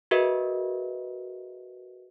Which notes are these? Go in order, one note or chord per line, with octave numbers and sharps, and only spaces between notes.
F#4 G#4 A#4 B4 D#5 E5